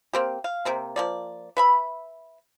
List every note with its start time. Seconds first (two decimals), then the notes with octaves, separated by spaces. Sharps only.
0.13 A#3 C4 G4
0.44 F5
0.65 C3 A#3 C4
0.96 F3 A#3 D5
1.57 B4 E5 B5